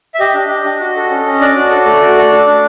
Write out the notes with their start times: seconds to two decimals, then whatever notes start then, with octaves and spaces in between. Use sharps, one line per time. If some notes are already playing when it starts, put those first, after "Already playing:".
0.14 E5
0.19 G4 D#5
0.34 D4
0.49 G4
0.65 D4
0.80 F#4
0.96 A4
1.10 C#4
1.26 C#4
1.41 D4 D5
1.56 F#4
1.70 A4
1.86 A3
2.00 F#4
2.17 A4
2.32 D4
2.47 D4